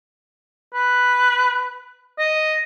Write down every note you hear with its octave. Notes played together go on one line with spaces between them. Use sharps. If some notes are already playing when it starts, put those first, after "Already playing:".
B4
D#5